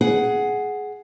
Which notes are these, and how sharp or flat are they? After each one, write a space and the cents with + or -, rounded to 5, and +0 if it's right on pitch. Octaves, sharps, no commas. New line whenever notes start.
G#4 +10 F#5 +0